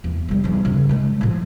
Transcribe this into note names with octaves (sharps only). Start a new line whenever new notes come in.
E2
D#3 G3
E2 D#4
C#3
D#3 G#3
A2 F3